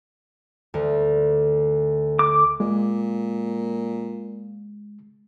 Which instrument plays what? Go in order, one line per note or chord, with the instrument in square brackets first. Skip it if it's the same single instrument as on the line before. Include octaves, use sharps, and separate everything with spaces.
[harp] D2
[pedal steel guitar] D6
[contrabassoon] A#2 [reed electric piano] G#3